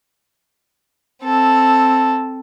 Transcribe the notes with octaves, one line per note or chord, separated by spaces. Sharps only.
C4 A4